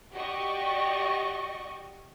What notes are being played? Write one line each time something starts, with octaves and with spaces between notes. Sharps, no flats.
F#4 G4 D5 D#5 C#6